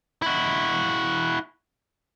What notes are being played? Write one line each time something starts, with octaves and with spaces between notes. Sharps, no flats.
E4 F#4